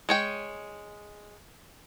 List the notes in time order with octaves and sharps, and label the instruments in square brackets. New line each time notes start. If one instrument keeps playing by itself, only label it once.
[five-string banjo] G#3 C#5 G5